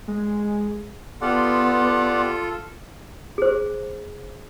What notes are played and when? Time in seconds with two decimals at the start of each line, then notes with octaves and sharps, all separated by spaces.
0.08 G#3
1.22 B3 F4 G4 A4 D5 F#5 C6
3.38 G#4 C5